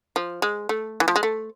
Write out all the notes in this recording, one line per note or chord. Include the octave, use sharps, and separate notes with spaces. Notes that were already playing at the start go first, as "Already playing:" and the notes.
F3
G#3
A3
E3
F3
G#3
A3